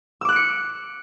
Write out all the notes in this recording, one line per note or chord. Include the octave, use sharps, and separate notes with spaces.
D6 E6 F#6 C#7 D7